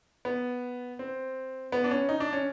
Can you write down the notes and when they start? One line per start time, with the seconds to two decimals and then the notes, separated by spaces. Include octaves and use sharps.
0.25 B3
0.99 C4
1.72 B3
1.84 D4
1.91 C#4
2.09 D#4
2.20 D4
2.33 C#4